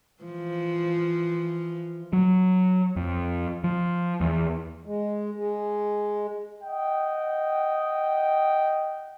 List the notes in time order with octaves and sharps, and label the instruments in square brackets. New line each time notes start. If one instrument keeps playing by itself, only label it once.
[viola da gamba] E3 F3
[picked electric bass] F#3
F2
F3
E2
[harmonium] G#3
G#3
[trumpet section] D#5 F#5 G5